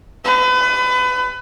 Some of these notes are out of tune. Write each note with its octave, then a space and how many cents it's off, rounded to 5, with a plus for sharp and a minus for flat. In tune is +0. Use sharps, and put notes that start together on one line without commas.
B4 +30